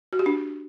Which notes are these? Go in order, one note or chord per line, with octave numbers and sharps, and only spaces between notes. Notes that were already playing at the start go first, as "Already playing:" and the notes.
F#4
G4
D4